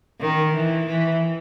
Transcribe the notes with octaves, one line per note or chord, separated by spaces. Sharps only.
D#3
E3
E3